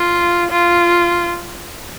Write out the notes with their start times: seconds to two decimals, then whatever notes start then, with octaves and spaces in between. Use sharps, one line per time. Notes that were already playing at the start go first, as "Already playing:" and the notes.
Already playing: F4
0.51 F4